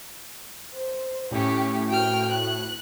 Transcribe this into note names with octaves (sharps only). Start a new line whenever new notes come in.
C5
A2 C#4 G4
F#4 G5 F6
F#6